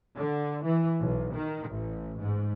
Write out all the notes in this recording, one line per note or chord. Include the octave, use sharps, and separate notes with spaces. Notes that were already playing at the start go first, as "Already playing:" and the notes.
D3
E3
B1
D#3
A1
G#2